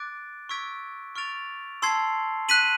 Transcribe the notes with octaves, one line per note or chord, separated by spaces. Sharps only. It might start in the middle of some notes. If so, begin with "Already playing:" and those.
Already playing: D6 F#6 A6 D7
C#6 E6 G#6 B6 D7
C#6 F6 A6 D7 F7
A5 C6 E6 G#6 C7
F#6 B6 D#7 F#7